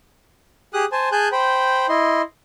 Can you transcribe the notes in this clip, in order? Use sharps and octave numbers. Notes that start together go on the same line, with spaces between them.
G4 G#4 D#6 F#6
C5 G#5 A5
G#4 G#5 A5 F#6 G6
C5 G5 B5
E4 D#5 C6